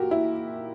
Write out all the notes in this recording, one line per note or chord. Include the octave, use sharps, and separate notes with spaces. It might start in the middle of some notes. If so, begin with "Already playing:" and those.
Already playing: A#2 F#4 G4 A#4
E4